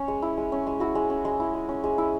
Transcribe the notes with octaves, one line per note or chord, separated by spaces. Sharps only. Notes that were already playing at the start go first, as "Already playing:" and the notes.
Already playing: C#4 C#5
G#3
E4
G#3
C#4
G#3
E4 F#4
G#3
C#4
G#3
E4
G#3
C#4
G#3
E4